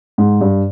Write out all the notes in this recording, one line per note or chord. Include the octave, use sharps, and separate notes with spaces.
G#2
G2